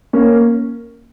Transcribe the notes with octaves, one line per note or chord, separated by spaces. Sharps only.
A#3 C#4